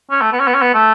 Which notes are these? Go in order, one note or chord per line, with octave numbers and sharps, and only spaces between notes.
C#4
A3
B3
C#4
B3
C#4
B3
A3